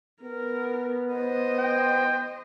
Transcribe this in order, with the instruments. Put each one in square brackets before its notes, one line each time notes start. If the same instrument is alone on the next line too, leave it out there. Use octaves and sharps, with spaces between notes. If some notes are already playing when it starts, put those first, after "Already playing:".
[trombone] B3 [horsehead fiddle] A#4
[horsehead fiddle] C5 D#5
[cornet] G5